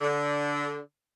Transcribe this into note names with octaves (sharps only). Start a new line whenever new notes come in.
D3